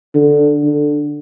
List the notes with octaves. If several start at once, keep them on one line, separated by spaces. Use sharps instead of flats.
D3
D3